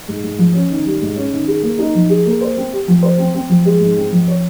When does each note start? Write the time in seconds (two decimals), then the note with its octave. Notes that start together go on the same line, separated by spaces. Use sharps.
0.08 G#2
0.23 G#2
0.39 F3
0.54 C#4
0.70 D#3
0.86 G3
1.02 G#2
1.16 C#4
1.32 D#3
1.47 G#4
1.63 A#3
1.79 D#4
1.95 F3
2.09 G#4
2.26 A#3
2.41 C5
2.57 C4
2.72 G4
2.88 F3
3.03 C5
3.18 C4
3.34 C4
3.49 F3
3.65 G#3
3.80 G#2
3.97 C4
4.12 F3
4.28 C#5